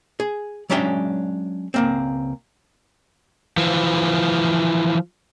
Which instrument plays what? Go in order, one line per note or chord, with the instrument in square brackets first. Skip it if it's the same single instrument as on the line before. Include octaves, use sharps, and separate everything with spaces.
[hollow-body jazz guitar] G#4
F#3 G#3 C#4 D4 E5 G5
C#2 A#3 C4
[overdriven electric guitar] E3 F3